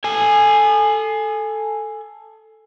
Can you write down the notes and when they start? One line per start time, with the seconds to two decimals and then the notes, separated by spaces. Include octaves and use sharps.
0.04 A4 G#5